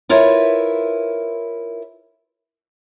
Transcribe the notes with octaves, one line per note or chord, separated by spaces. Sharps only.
E4 F4 A#4 B4 C#5 E5